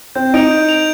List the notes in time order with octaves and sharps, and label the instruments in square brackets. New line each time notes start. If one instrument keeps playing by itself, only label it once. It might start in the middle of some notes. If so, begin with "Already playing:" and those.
[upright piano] C4 [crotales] G6
[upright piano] D#4 [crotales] D7 F7
[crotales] G6
D7 F7